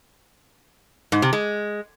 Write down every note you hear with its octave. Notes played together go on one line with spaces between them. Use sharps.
G#2
C3
G#3